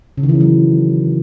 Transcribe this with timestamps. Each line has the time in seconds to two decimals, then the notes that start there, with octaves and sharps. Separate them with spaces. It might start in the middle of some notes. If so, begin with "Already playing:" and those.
0.17 C#3
0.23 D#3
0.29 E3
0.35 C#4
0.41 F#3